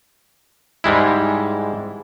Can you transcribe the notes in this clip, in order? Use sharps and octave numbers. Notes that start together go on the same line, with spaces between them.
G#2 G3 G#3 E4